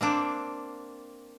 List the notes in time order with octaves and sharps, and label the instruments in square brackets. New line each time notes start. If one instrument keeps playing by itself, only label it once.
[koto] A#3 C4 D4